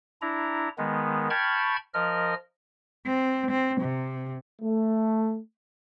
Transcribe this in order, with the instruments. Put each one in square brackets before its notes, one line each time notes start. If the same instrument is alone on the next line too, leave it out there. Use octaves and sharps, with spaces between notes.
[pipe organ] D4 E4 A#5
D#3 G#3 B3
G5 A5 B5 C#6 F6 G#6
F3 A#4 D#5 F6
[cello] C4
C4
C3
[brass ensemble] A3